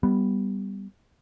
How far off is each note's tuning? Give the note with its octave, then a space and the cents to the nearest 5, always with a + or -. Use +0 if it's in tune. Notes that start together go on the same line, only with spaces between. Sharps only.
G3 +0 B3 +0